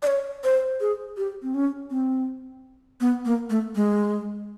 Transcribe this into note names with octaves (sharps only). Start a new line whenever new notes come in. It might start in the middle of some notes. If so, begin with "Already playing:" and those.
D5
C#5
C5
G#4
G4
C4
C#4
C4
B3
A#3
A3
G#3